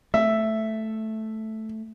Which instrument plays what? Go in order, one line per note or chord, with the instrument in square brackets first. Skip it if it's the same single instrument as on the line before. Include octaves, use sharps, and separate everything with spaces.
[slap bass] A3 [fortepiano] E5